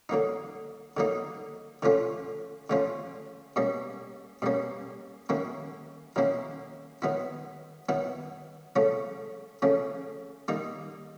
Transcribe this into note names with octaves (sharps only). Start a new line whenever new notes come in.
D3 F#3 A#3 D#4
D3 F#3 A#3 D#4
D3 F3 A3 C#4 F4
D3 F3 A3 C#4 F4
B2 G3 A#3 C#4
B2 G3 A#3 C#4
D#3 F#3 A#3 C#4 E4
D#3 F#3 A#3 C#4 E4
D#3 F#3 B3 E4
D#3 F#3 B3 E4
C#3 F3 A3 C#4
C#3 F3 A3 C#4
D#3 G3 A#3 D#4